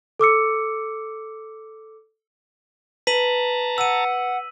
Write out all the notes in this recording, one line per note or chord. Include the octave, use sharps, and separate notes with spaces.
A4 D6 E6 C#7
B4 A5 A#5 B6 D#7 F#7
F#5 E6 D#7